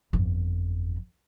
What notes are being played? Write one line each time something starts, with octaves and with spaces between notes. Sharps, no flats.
G1 F2